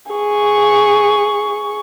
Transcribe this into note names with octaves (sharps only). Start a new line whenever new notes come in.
G#4 C#6